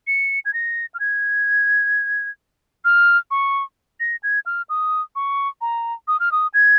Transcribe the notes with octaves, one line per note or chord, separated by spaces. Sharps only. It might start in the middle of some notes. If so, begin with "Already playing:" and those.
C#7
G#6
A#6
F6
G#6
F6
C#6
A#6
G#6
F6
D#6
C#6
A#5
D#6
F6
D#6
G#6